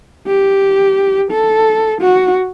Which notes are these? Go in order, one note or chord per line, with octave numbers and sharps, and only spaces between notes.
G4
A4
F#4